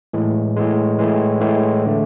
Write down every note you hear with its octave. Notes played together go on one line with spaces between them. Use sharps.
A2 E3 G#3
A2 E3 G#3
A2 E3 G#3
A2 E3 G#3
D3 A3